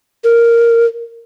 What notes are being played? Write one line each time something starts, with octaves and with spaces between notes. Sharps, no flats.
A#4